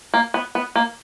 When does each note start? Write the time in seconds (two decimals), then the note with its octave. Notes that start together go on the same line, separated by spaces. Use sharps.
0.14 A#3
0.34 B3
0.55 B3
0.75 A#3